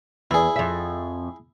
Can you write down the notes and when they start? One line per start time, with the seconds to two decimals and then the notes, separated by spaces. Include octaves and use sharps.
0.31 E2 E4 G#4
0.56 F2 E5